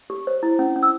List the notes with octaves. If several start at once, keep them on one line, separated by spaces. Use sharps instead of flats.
G4
C5
E4
C#4
C#4
E6